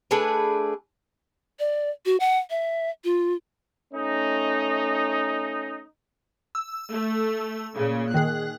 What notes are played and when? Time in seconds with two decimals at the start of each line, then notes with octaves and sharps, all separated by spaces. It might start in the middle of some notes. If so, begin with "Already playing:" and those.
0.11 A3 D4 G#4 B4
1.59 D5
2.06 F#4
2.20 F#5
2.50 E5
3.04 F4
3.94 A3 C#4 D#4
6.55 E6
6.92 A3
7.76 A#2 C#3
8.14 D#3 G#4 F#6